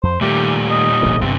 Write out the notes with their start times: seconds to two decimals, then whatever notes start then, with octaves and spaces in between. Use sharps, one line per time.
0.03 F2 C5
0.21 A#2 D#3 G3 A3 G4
0.70 D#5
1.02 E1 A#1 D3
1.21 G1 G2 C3 C4